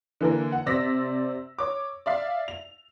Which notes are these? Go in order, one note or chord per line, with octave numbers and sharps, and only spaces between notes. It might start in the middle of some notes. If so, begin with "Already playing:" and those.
D3 E3 A#3 A#4
F#5
C3 C5 D5 E6 A#6 B6
C#5 D6
D5 E5 F5
F7